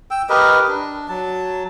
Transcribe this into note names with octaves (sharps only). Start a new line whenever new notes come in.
G5 E6
G4 A#4 B4 D#5
D4
F#3 A5